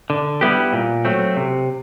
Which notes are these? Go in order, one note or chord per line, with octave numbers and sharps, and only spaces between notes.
D3
G3 B3 E4 G4
A#2
F#3 A3 C4
C3